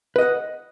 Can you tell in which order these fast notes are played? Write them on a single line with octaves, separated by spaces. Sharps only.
B4 D#5 F#5